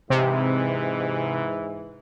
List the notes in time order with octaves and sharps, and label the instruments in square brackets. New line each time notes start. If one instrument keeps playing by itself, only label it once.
[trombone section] G#2 E3 [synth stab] C3